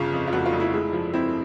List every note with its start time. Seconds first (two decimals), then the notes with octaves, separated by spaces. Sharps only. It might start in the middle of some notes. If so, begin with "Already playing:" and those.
Already playing: G1 C#3 F4
0.13 F2
0.27 F4
0.33 F1 F#4
0.46 F4
0.53 F1
0.60 E4
0.73 G#3
0.93 F3
1.13 C4 E4